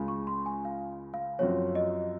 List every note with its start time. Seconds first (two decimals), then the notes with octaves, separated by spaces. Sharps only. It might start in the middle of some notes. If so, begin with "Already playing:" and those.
Already playing: C#2 C#3 G#3
0.08 C#6
0.27 C6
0.46 G#5
0.65 F5
1.14 F5
1.39 F#2 F3 C4 F#4 C#5
1.75 D#5